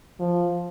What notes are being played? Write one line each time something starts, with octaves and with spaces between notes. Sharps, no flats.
F3